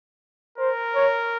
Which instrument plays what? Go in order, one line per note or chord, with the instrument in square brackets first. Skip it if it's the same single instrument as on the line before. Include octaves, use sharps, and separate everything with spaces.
[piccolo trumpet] A#4 [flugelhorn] C5
[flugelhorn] C#5